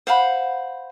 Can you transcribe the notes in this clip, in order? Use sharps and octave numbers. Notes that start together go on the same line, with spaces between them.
C5 F5 F#5 B5